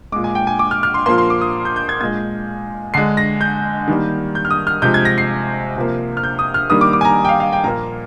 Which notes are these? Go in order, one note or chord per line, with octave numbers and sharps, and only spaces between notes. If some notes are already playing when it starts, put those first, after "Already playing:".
A#2 G#3 D6
G#5
G5
G#5
D6
F6
F6
C6
A#2 F3 A#3 C6
C6
D6
D#6
G6
G6
G#6
A#2 G#3 G#6
D3 G#3 C7
A#6
G6
D#3 G3 A#3
G6
F6
D#6
F6
C3 F3 G#3 G6
G#6
A#6
C7
C3 F3 A#3
F6
G6
D#6
F6
D#3 G3 A#3 D#6
D6
D6
G#5
A#5
G5
F5
F5
G5
A#2 F3 A#3 A#5